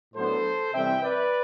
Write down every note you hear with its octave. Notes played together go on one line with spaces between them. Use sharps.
A2 F#3 B3 D4 A4 C5
C3 E3 G3 C4 E5 G5
B4 D5